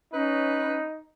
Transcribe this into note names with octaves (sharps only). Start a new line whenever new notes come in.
C#4 D#4 B4